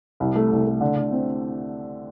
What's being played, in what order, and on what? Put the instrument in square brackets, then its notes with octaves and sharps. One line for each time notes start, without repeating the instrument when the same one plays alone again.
[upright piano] C2
A3
C2
A3
D3
D3
C4